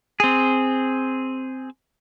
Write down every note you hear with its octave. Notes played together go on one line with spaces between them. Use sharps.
C4 G#4